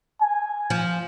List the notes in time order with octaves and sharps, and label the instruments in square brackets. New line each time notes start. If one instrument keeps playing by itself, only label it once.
[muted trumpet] G#5
[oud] F3